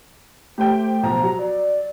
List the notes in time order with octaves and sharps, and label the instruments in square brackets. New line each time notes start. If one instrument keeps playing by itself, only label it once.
[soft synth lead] A3 [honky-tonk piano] G4 C5 G5
[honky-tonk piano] B1 F3 A#5
[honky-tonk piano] F#3 [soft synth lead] A#5
[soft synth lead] D5